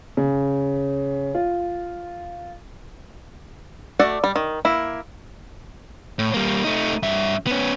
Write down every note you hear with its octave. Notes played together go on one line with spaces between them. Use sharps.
C#3
F4
A3 F#4 D5 F#5
G3
D#3
A#3 E4
A2
G3 A#3
A3 D#4
G2 E5
B3 C#4